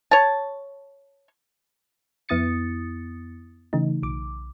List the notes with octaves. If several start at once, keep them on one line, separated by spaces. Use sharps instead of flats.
C#5 A5
F2 B3 E4 D#6 A6 C#7
C#3 E3 A3 D#4
B1 D6